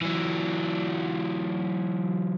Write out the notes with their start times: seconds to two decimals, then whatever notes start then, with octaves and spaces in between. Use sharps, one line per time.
0.02 E3 F#3